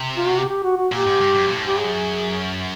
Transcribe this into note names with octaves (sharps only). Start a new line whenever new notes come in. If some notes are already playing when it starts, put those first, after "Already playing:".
Already playing: C3
F4
F#4
G4
G4
F#4
F#4
A#2 G4
G#2
G2
F#2
A#2
A2
G#2
G2 G4
F#2 G#4